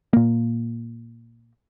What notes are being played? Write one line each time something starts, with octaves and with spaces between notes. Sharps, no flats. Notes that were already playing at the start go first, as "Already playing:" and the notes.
A#2 A#3